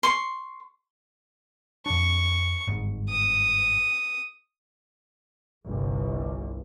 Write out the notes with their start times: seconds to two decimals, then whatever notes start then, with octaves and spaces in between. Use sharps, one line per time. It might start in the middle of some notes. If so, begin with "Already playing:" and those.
0.03 C6 C#6
1.86 F2 D4 C#6
2.67 G1 G#2
3.09 D#6
5.66 G1 C2